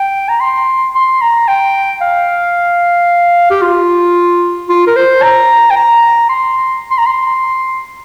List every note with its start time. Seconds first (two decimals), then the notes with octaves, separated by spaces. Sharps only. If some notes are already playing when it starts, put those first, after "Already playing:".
Already playing: G5
0.29 A#5
0.40 C6
0.95 C6
1.21 A#5
1.48 G5
2.01 F5
3.51 G4
3.62 F4
4.69 F4
4.87 A#4
4.96 C5
5.23 A#5
5.70 G5
5.77 A#5
6.30 C6
6.91 C6
6.98 A#5
7.06 C6